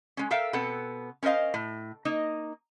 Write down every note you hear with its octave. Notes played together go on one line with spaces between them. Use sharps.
G#3 C#4
A4 A#4 E5 F5 G5
B2 B3 C4 A4
C#4 A#4 C5 D#5 F5
A2
A#3 D#4 D#5